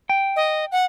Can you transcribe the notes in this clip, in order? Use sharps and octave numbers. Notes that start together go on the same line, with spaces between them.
G5
D#5
F#5